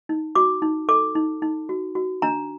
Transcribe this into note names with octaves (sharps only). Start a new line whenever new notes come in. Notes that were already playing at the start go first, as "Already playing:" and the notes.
D#4
F#4 D6
D#4
A4 D6
D#4
D#4
F#4
F#4
D4 A#5